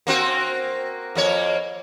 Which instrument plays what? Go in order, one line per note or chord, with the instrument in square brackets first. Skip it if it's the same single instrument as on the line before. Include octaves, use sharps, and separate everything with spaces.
[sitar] A#3 C4 F#4
F2 A#3 C#5